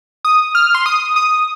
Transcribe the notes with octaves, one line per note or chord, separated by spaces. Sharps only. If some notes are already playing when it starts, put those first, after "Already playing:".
D#6
F6
C6
D#6
D#6